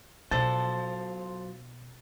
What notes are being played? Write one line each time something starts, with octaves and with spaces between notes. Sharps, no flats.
B2 F#3 D4 F4 A4 C5 A6